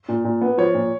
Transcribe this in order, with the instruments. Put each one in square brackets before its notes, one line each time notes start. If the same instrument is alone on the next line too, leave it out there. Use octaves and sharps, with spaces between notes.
[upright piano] A#2
A#2
B3
[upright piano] F3 [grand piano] C#5
[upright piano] A#2